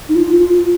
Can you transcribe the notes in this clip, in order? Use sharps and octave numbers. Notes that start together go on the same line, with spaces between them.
D#4
F4
F4
F4